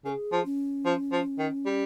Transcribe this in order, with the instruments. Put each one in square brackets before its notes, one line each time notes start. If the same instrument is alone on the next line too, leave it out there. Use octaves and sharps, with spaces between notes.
[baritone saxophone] C#3 [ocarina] A#4
[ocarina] G#4
[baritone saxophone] F3
[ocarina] C#4
[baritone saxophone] F3
F3
D#3
G3